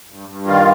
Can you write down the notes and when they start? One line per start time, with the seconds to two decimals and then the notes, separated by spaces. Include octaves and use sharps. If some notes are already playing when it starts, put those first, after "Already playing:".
0.10 G2
0.29 G2
0.47 D#3 F4